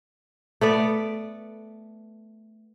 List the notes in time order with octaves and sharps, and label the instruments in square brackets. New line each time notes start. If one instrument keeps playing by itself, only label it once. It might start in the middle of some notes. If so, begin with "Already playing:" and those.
[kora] A3 B3 D5